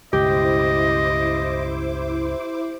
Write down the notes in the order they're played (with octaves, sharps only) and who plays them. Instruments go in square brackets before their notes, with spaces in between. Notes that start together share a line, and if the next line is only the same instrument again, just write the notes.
[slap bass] C#2 G2 B2 [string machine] E4 C5 D6 [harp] G4 [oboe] D#5